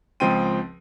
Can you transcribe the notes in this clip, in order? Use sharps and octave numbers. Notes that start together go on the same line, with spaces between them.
C#2 F3 C4 G5 C6 D#7